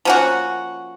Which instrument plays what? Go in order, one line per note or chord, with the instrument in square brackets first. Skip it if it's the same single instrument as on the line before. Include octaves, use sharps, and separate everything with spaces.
[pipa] F3 A#3 C#4 F#4